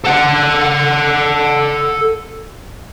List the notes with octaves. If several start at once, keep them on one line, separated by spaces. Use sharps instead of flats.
A4 F#5